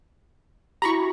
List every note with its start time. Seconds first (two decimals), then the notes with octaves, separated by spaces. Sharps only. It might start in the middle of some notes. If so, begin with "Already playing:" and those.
0.82 E4 F#4 G4 A#5 B5 C#6